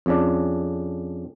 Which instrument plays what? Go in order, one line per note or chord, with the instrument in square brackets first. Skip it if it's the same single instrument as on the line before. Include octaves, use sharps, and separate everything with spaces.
[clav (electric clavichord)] F2 C#3 D4